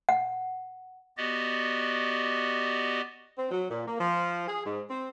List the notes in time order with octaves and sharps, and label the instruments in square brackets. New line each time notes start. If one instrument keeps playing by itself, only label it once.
[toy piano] F#5
[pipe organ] B3 F#4 G4 D5 D#5
[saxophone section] C4
F#3
A#2
A#3
F3
G#4
G#2
C4